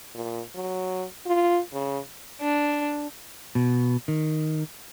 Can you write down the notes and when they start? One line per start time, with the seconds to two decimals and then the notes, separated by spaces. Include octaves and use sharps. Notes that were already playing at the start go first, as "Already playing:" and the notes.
0.15 A#2
0.55 F#3
1.27 F4
1.73 C#3
2.41 D4
3.55 B2
4.08 D#3